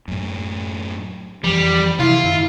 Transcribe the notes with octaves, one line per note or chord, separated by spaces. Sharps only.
F#2 A2
F2 E3 F3 G3
C3 E3 E4 F4
F#2 D#3